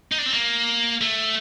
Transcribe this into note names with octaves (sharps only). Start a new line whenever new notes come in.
D#4
D4
C4
A#3
A3